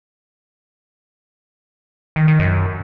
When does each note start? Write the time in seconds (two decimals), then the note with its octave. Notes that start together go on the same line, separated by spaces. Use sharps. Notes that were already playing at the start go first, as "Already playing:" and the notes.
2.16 D#3
2.28 D#3
2.40 F#2